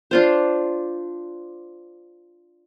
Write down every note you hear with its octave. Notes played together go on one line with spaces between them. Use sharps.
D4 F4 C5